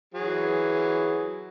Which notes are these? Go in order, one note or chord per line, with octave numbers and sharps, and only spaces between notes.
E3 F#3 G#4